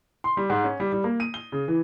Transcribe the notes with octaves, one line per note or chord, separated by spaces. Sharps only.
C6
G3
G#2
C#4
G3
G3
A#3
D#7
G7
C#3
E3